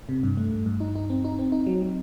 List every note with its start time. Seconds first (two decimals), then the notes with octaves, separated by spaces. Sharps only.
0.09 C3
0.23 G2
0.37 A3
0.51 G2
0.66 G2
0.80 D#4
0.95 D#4
1.10 C4
1.24 D#4
1.39 C4
1.52 D#4
1.67 F#3
1.82 F#3